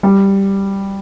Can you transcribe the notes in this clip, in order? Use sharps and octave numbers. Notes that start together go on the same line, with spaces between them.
G3